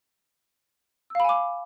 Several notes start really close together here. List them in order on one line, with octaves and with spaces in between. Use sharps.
E6 F5 B5 G#5 D6